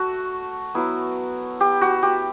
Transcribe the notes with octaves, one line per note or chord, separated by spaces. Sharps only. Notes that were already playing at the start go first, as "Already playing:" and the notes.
Already playing: A3 F#4
F#3 B3 E4
G4
F#4
G4